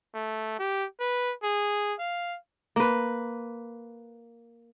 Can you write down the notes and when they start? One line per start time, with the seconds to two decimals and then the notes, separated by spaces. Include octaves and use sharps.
0.14 A3
0.59 G4
1.00 B4
1.43 G#4
1.99 F5
2.76 A#3 B4